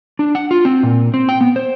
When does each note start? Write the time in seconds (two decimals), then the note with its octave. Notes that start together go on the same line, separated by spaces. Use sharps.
0.19 D4
0.35 F#5
0.51 F4
0.65 C4
0.83 A#2
1.14 C4
1.29 G5
1.41 B3
1.56 C5